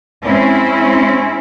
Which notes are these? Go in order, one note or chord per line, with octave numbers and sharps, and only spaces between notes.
G#3 C4 C#4 E4